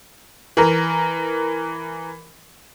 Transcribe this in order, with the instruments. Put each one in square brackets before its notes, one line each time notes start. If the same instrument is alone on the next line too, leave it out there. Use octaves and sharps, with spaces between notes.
[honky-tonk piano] E3 A#4